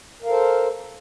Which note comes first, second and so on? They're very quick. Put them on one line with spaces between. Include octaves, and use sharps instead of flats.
A#4 F5 A4 C5